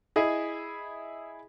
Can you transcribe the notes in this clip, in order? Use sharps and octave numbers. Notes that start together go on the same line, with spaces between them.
E4 G#4 D#5